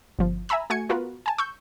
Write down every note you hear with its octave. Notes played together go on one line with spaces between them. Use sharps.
G1 F3
E5 G#5 A#5 B5 E6
A3 F#4 G#5 G#6 C#7
B3 F4 F#4 A#4 B4
G#5 A5
C#6 E6 G6